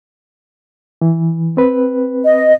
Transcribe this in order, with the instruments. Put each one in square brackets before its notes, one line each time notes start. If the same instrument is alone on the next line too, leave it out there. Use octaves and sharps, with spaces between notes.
[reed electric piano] E3
C4 B4
[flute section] D#5